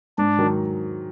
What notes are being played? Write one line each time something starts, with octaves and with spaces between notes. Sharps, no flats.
G#2 D4
D#3 F#3